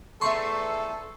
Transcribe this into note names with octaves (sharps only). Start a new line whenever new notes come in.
E2 A3 A4 E5 C6 C#6 C7